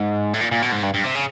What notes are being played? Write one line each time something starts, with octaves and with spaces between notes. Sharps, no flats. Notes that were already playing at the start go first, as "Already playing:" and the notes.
Already playing: G#2
A2
A#2
A#2
B2
G#2
G2
G2
C3
C#3